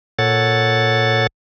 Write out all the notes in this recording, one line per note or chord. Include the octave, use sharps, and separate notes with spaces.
A#2 A4 C#5 F#5 A6